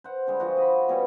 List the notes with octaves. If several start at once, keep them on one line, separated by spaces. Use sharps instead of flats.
C5 F#5
D3 G3 G#3
F3 F#4
D#5 B5
B2 G3 C#4 C#5